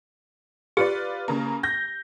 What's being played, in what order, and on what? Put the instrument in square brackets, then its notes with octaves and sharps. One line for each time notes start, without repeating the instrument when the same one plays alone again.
[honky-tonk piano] F4 B4 D5 [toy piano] G4
[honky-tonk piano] C#3 A#3
G6 A#6